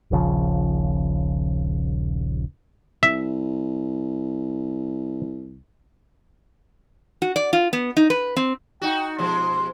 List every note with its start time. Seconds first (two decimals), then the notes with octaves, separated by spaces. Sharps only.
0.11 D#1 A#1 C#3 F3
3.03 C2 E5
7.22 F#4
7.36 D5
7.53 F4
7.73 B3
7.97 D#4
8.10 B4
8.37 C4
8.82 D#4 F#4 G5
9.19 B2 F3 G#3 C6